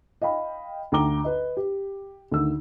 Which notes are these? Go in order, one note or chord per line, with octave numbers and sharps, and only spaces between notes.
D#5 F5 G5 B5
D2 G5 A#5 D6 G7
B4 D#5
G4
D2 D#3 E6